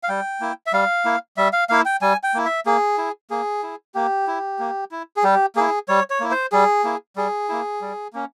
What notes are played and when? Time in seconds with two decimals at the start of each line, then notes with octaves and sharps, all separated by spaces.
0.03 F5
0.09 G3 G5
0.40 A#3 E4
0.66 E5
0.73 G3 F5
1.05 A#3 E4
1.37 G3 E5
1.53 F5
1.69 A#3 E4 F5
1.85 G5
2.02 G3 G#5
2.23 G5
2.34 A#3 E4
2.45 E5
2.66 A#3 G#4
2.98 E4
3.30 A#3 G#4
3.63 E4
3.94 A#3 G4
4.27 E4
4.59 A#3
4.91 E4
5.17 G#4
5.23 G3 G4
5.56 A#3 E4 G#4
5.88 G3 C#5
6.10 C#5
6.20 A#3 E4
6.31 C5
6.52 G3 G#4
6.84 A#3 E4
7.16 G3 G#4
7.49 A#3 E4
7.81 G3
8.13 A#3 C#4